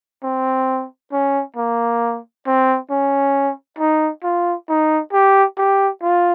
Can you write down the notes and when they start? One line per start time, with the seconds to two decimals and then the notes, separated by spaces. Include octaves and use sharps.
0.23 C4
1.12 C#4
1.57 A#3
2.46 C4
2.90 C#4
3.79 D#4
4.23 F4
4.69 D#4
5.13 G4
5.58 G4
6.02 F4